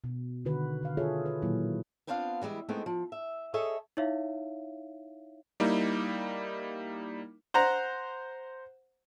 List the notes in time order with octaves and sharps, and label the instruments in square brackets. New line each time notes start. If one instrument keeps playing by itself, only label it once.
[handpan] B2
D3 D#3 F#4 B4
D3 F5
F4 G#4 A4 C#5 E5
B4
A#2 D#3 F#3 A#3 E4
[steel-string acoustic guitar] B3 C4 D4 F4 D5 F5
E3 G3 G#3 E4
G#3 A3 B3 C4 D#4
F3
E5
G#4 A4 C#5 D#5 E5
[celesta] D#4 E4 C#5 E5 F5
[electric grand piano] G3 A#3 D#4 E4
[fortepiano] C5 F#5 A#5